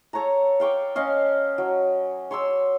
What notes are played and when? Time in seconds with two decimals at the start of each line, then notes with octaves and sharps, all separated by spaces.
0.13 A4 C#5 F#5 A#5
0.60 F5 G5 C#6 D6
0.95 C#4 D#5 F5 C#6
1.58 F#3
2.31 C#5 C6 D6 E6